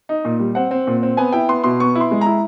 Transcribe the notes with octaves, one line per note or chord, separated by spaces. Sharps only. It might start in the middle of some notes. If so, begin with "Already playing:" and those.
D#4
A#2
G3
C4 F#5
C4
A#2
C4
B3 G#5
E4 G5
B3 C6
B2 C6
B3 C#6
E4
C6
G#3
E4 A#5